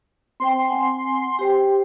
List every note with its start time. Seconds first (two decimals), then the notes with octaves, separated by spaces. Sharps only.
0.40 C4 C5 G5 C6
0.68 C4 F#5 G#5
1.39 G4 C5 G5